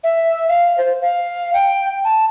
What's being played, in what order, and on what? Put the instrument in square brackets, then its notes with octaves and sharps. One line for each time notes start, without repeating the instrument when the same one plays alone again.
[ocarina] E5
F5
C5
F5
G5
A5